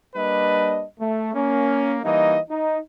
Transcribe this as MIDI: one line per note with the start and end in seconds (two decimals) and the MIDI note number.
0.15 0.83 55
0.15 0.83 58
0.15 0.83 62
0.15 0.83 71
0.15 0.83 75
1.00 1.33 57
1.34 1.97 58
1.34 1.97 61
2.04 2.37 52
2.04 2.37 55
2.04 2.37 58
2.04 2.37 63
2.04 2.37 75
2.50 2.78 63